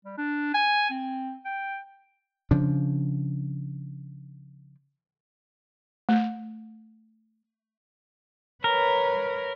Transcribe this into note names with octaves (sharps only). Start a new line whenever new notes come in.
G3
D4
G#5
C4
G5
C#3 F3 D4
A3
A#4 B4 C#5